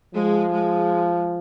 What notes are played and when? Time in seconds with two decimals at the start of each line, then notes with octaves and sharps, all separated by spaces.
0.14 F3 G#3
0.52 G#3